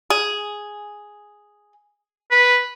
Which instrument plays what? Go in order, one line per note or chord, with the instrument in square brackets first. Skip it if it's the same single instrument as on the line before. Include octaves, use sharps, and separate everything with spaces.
[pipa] G#4
[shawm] B4